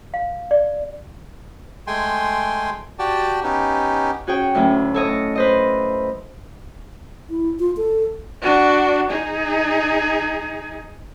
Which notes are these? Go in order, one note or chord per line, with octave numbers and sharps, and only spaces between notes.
F5
D5
G#3 A3 G5 G#5 C6
F#4 G4 D5 G5 A5
B3 C#4 D#4 G4
C#4 F#4 G#4 C#5 G5
D2 A2 F#3 C#4
A4 C#5 D#5
B4 C5 D#5
E4
F4
A4
D4 F#4
D#4 G#4